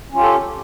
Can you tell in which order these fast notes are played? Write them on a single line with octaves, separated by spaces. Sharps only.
C#4 F4 G4 A4